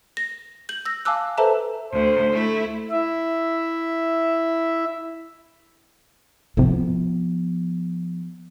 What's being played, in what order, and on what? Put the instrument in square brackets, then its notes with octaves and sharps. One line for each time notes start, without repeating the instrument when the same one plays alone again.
[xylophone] A#6
G6 F#7
E6 A#6
F5 G#5 A5 D6 E6 F#6
A4 B4 C5 E5 A5 A#5
[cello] D2 [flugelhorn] C5
[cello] A3 E4
[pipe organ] E4 E5
[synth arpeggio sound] C2 A2 C3 [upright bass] F3 B3